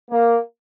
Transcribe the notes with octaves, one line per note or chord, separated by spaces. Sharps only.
A#3